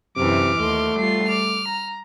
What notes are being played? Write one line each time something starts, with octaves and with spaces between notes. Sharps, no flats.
F#2 C3 E3 D6 F6
D#2 A3 C6
G3 F4 C7
D6 F6
A#5